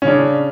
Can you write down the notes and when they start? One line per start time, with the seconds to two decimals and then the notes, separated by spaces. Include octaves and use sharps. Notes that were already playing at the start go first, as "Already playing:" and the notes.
0.02 C#4
0.05 C#3
0.08 D4